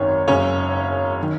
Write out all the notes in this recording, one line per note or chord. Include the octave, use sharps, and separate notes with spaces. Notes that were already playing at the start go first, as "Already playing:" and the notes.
Already playing: G#1 F#2 D#3 C#4 C#5
F#1 F#2 C#3 C#4 C#5
D#3